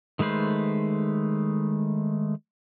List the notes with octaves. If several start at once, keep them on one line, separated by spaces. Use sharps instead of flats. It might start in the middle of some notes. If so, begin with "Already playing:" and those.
D#3 G#3 A3 B4 C5